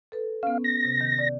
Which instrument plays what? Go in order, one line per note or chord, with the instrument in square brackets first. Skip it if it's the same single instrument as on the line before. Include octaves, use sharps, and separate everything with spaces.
[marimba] A4 B4
[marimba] B3 C#4 [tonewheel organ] F5
[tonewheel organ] A#6
[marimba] C3
D#3
D5